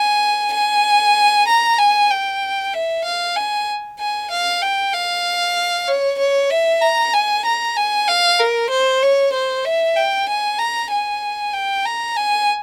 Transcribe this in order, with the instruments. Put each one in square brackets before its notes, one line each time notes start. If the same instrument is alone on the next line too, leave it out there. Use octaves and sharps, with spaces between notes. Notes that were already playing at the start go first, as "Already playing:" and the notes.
Already playing: [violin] G#5
G#5
A#5
G#5
G5
E5
F5
G#5
G#5
F5
G5
F5
C#5
C#5
E5
A#5
G#5
A#5
G#5
F5
A#4
C5
C#5
C5
E5
G5
G#5
A#5
G#5
G5
A#5
G#5